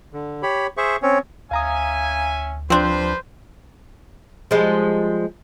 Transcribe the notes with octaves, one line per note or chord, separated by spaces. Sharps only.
D3
G4 C#5 B5
G#4 C5 E5 C#6
C4 C#4 C#5
D2 C#4 E5 F5 G#5 A#5 D#6
F3 G3 C4 D4 B4 C5
F3 G3 G#3